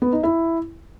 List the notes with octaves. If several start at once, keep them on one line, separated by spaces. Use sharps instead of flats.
B3
D#4
E4